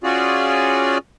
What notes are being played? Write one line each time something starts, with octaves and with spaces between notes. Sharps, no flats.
C#4 F4 F#4 G#4 D5